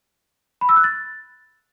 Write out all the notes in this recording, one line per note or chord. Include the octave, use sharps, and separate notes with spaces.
B5
E6
F#6
A6